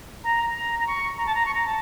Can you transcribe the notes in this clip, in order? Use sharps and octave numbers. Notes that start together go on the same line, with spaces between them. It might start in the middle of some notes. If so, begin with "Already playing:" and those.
A#5
A#5
A#5
C#6
A#5
A5
A#5
C#6
A#5
A5